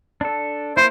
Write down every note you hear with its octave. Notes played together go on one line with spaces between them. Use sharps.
D4 A4
A#3 C4 E4 C5